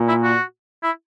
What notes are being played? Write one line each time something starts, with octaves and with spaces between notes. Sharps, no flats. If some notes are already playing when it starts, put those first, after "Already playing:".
Already playing: A#2
E4
F#4
E4